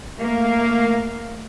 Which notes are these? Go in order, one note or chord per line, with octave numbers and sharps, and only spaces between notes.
A3 A#3 A#4 F5